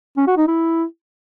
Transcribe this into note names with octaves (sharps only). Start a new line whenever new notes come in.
C#4
F#4
D#4
E4